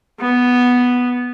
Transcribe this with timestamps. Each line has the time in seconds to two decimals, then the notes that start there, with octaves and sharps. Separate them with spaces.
0.21 B3